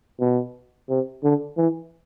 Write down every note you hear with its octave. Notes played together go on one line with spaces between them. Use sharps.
B2
C3
D3
E3